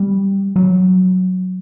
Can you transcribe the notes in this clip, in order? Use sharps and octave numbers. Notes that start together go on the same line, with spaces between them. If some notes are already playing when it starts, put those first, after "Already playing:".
Already playing: G3
F#3